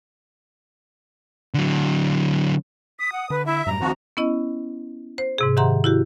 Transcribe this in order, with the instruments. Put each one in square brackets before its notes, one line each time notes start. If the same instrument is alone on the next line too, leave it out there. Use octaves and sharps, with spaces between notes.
[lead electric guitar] D3 F#3
[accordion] D#6 [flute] B6
[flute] F#5
[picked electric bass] D3 [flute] B4
[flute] E4 [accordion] E5
[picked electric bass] F#2 A2 G3 [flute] A#5
[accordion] D2 F3 F#4 [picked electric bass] D#3 C4
[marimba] B3 C#4 E4 D#5
C5
G#2 C3 G#4
D#3 G4 E5 F#5 A#5 C6
E4 F#4 G4